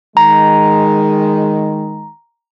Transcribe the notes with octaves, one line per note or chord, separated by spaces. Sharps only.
D#3 G#3 A#5